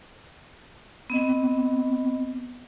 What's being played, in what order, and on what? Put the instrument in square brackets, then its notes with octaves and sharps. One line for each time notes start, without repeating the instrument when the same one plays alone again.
[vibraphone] B3 C4 D#5